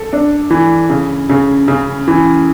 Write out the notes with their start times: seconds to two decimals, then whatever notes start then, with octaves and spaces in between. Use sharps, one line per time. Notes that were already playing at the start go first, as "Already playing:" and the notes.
Already playing: A4
0.13 D4
0.50 E3
0.89 C#3
1.29 C#3
1.68 C#3
2.08 E3